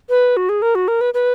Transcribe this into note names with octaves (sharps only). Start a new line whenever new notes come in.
B4
F#4
G#4
A#4
F#4
A#4
B4
B4